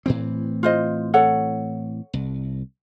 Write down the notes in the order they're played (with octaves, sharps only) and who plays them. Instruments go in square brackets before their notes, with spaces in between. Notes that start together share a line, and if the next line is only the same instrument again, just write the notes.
[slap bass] A2 E3 C4
[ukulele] F4 C5 D#5
A4 C#5 F#5
[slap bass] C2